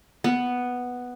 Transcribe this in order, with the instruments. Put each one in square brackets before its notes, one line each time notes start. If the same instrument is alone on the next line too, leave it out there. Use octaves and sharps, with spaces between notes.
[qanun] B3